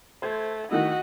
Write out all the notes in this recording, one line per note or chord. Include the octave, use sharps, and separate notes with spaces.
A3 C5 G#6
D#3 A3 E4 F#4 D#5